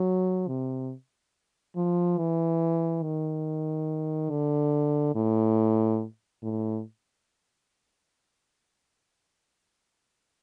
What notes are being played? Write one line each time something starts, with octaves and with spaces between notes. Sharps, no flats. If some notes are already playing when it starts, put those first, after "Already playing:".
Already playing: F#3
C3
F3
E3
D#3
D3
A2
A2